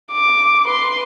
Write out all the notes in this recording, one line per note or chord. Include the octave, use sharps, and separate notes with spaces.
D6
B4 C6